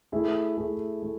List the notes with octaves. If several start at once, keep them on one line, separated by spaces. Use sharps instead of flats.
A3 E4 G#4
A3 E4 G#4
A3